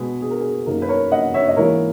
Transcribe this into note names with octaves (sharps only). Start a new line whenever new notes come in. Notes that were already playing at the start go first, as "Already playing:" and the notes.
Already playing: B2 G#3 G#4 B4
G#4
A#4
G#4
F#2 D#3 A#3 A#4
B4
A#4 C#5
D#5 F#5
C#5 E5
D#5
G#2 E3 A#3 A#4 C#5